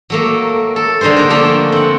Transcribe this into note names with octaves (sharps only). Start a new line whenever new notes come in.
F#3 A3 A#3
A4
D3 G3 D#4 G#4 C5
A#3 A#4
F3 A3 A#3 D4
C4 F#5